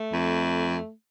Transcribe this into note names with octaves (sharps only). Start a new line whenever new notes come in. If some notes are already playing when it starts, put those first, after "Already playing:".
Already playing: A3
F2